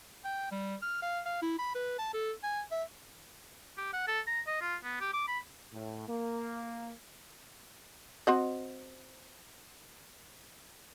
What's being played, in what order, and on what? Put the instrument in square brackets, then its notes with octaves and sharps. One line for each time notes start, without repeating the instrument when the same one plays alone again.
[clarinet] G5
G3
F6
F5
F5
E4
B5
B4
A5
A4
G#5
E5
[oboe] G4
F#5
A4
A#5
D#5
F4
B3
G4
D6
B5
[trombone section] A2
A#3
[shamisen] C4 F#4 D#5